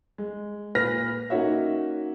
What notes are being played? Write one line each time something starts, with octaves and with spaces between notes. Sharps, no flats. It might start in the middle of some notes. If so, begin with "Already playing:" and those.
G#3
A#2 B4 F6 A#6
A#3 C#4 D#4 F#4 C#5 E5